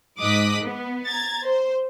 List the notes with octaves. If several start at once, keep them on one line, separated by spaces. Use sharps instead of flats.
G#2 D#5 D6 D#6 F#6 B6
B3
A#5 G#6 A6
C5